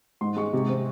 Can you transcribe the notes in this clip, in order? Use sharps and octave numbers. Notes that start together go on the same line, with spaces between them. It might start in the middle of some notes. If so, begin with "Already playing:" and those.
G#2 C6
G#3 C#6
C3
C4